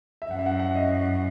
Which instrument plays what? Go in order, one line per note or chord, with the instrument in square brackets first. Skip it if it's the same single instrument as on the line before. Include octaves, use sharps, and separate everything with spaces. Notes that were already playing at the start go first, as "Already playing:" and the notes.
[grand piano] E5
[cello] F#2 [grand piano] F#5
[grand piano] E5
F#5
F#5
D#5